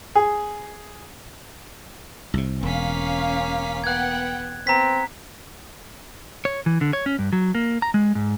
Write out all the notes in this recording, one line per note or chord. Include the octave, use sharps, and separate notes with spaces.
G#4
C2 C3
E1 A#3 C#4 F5 B6
B3 F#5 G5 F#6 G#6
B3 C4 A#5 B6
C#5
E3
D3
C#5
C#4
G2
F#3
A#3
A#5
G#3
G#2